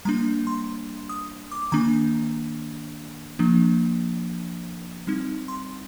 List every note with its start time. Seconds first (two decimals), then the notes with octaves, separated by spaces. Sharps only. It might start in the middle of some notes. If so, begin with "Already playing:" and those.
0.05 G3 A#3 D4 A#5
0.47 C6
1.09 D#6
1.52 D6
1.72 D#3 A#3 D4 A#5
3.39 F3 A#3 D4
5.07 G3 C4 D#4
5.48 C6